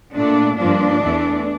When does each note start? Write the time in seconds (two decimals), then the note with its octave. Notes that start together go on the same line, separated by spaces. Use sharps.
0.14 A#2 A3 D4
0.57 G2 F3 A#3 D4
1.00 E2 E3 A3